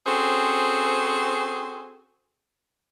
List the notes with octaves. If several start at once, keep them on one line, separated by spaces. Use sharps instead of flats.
C4 C#4 F#4 G#4 A4 C5